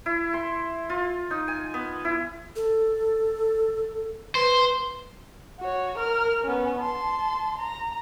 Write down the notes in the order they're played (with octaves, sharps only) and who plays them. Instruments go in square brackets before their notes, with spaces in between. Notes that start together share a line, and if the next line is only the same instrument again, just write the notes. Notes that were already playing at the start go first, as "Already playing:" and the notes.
[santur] E4
C6
F4
D#4
G#5
B3
E4
[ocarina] A4
[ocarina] B4 [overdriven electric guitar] C5
[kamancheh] F#4 C#5
A#4 F6
B3 C#4
A5 C6
A#5